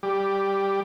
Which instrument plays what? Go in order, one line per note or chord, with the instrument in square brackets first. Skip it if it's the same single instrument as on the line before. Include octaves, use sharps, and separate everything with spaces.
[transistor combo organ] G3 G4